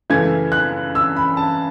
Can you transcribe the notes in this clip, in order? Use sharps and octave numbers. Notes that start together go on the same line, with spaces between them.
F#2 C#3 E3 A3 G#6
F#6
E6
B5
A5